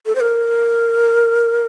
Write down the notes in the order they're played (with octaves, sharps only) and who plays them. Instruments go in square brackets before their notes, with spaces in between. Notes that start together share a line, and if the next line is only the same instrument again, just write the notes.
[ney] A4
C5
A#4